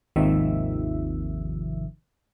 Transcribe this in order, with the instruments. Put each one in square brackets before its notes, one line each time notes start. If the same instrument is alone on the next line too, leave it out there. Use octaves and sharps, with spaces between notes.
[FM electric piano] G#1 D#2 C3 D#3 F3 E5